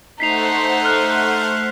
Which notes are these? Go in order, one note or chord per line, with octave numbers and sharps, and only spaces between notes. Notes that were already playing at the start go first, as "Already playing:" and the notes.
A3 D#4 C5 F#5 B6 C7 F7
F6 F#6